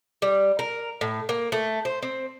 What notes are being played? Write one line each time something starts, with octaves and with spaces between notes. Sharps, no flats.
G3
A#4
A2
A#3
A3
C5
C4